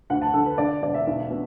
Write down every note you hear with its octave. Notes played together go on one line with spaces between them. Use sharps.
D2 F#5
A5
D3 A4
B4
D3 D5
E1 D5
E5
B1
B2